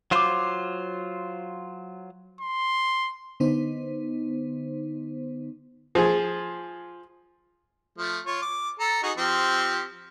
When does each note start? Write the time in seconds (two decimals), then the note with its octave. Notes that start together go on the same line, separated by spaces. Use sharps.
0.11 F#3 F4 C5 C6 D6
2.41 C6
3.40 D3 B3 D#4 C5
5.95 F3 G#4
7.98 F3 A3
8.26 F4 C#5
8.42 D6
8.80 A4 A#5
9.03 D#4 F#4 G#4
9.17 F3 C4 G4